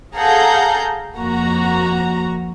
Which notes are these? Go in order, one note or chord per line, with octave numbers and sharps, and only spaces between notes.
G#4 A4 F5 F#5 A#5 G6
F2 A#3 F#4 A#5